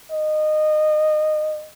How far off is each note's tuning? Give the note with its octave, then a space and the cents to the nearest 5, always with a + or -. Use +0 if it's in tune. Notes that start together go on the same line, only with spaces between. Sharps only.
D#5 -20